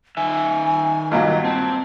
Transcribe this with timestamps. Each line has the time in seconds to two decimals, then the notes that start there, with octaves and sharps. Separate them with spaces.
0.17 D#3 E5 G#5
1.11 G2 A#2 F#3 D#5
1.44 C4 A5